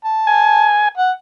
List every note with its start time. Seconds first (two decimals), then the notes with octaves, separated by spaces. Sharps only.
0.04 A5
0.27 G#5
0.97 F#5